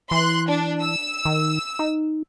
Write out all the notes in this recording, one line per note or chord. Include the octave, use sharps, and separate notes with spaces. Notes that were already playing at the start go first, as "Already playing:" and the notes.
E3 C6 F#6
D4
E6
D#3
D#4